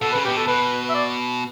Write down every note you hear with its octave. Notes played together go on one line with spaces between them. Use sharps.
B2 A4
C#3 B4
G4
B2
A4
B2 B4
E5
D5